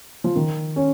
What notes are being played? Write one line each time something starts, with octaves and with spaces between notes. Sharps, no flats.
F3
D#3
C#4